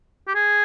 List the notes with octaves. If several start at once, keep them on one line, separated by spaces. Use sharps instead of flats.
G4
G#4